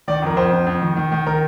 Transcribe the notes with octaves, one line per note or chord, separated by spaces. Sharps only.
D#3 D5
F2 A#4
F2 C5
F2
F2
D#3
D#3
D#3
D#3 A#4